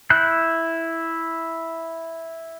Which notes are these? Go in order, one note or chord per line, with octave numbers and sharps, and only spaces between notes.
E4 F#6 G6